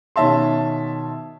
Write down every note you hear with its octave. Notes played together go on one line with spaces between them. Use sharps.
B2 D#3 C#4 E5 A5 C6